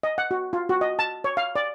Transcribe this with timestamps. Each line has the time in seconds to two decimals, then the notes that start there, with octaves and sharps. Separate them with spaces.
0.03 D#5
0.18 F#5
0.31 F#4
0.53 F4
0.69 F#4
0.81 D#5
0.99 A5
1.24 C#5
1.37 F5
1.56 D5